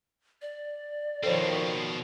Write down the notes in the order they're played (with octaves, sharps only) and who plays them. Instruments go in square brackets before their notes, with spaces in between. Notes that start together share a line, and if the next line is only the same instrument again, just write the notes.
[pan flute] D5
[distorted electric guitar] B2 C4 [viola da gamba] D#3 F3 [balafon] A4 C5 C#5